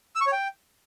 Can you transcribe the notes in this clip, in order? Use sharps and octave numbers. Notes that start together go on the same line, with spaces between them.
E6
C#6
C#5
G5